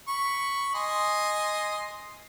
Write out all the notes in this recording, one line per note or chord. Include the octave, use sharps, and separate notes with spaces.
B5 C#6
D#5 G#5 C6